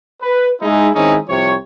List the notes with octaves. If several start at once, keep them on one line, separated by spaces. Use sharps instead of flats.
B4
G#3 D#4 E4
D#3 G#3 C4 C#4 D#4 E4
C2 C3 F3 C#5